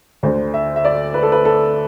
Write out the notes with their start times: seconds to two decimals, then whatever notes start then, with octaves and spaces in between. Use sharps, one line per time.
0.23 D2 D3 C5
0.54 E5
0.76 E5
0.85 D5
1.14 B4
1.23 A4
1.32 B4
1.45 A4